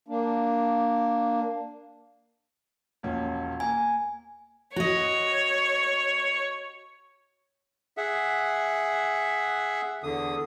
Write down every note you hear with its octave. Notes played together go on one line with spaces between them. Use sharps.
A#3 D4
E1 A#1 C#4
A#3 G#5
F#4 C#5 D#5
G#4 E5 F#5
E2 D3 D#6